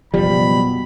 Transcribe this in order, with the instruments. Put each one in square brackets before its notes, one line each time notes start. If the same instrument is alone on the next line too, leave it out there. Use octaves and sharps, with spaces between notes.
[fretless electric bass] F#1 F3 G3 [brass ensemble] B2 [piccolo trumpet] B5